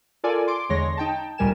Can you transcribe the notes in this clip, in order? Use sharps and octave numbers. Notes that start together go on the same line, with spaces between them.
F4 A4 A#4 D5 G#5
C6 D6 D7
E2 D3 G#3 C#5 C6 A#6
D#4 G5 A5
D2 A#2 G3 A#4 G#5 E7